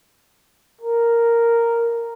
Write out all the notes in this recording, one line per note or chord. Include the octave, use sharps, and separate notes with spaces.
A#4